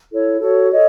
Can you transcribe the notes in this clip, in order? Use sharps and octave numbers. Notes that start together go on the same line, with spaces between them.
E4 A4 C#5
F#4 A4 C#5
A4 C#5 D#5